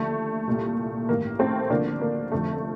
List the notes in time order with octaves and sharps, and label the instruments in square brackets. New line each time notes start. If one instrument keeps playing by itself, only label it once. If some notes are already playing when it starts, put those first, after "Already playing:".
Already playing: [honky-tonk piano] D#2 D3 F3 A3
C2 A#2 G3
A1 G2 D#3 G3 A#3
A3 C4
D2 D3 F3 A#3 D4
A#3
F1 F2 D3 F3 A3